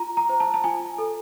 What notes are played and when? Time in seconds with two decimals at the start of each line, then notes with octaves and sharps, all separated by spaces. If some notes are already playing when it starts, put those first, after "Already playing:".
Already playing: F4 A#5
0.17 A#5
0.29 C5
0.40 A5
0.54 A5
0.64 F4 G#5
0.98 A4